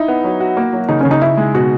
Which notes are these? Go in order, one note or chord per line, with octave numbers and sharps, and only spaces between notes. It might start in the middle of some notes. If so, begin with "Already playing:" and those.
Already playing: D#4 E4
B3
F#3
F#4
A#3
F#3
C#3 D#4
C#3 C#4
D#4
D#4 E4
G#3
B2 F#4